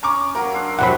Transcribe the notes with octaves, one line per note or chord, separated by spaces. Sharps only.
C#4 A#5 C#6 D6
F#3 A#3 A#4
D4 C6 E6
E2 C3 F#3 G3 B4 F#5 B5